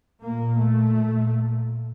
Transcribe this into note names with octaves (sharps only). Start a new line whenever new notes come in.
A#2 A#3
A3
A#2